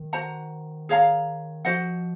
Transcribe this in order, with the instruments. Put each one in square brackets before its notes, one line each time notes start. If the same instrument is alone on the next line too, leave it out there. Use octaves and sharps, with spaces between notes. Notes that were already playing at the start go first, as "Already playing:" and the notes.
Already playing: [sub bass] D#3
[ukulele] F#4 C5 F#5 A#5
G#4 C#5 F5 A#5
[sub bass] F3 [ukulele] F#4 C5 D#5 F#5